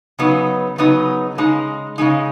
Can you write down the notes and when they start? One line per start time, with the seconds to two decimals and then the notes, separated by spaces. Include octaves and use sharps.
0.19 C#3 F#3 B3 D#4
0.78 C#3 F#3 B3 D#4
1.38 C#3 G#3 D#4
1.98 C#3 G#3 D#4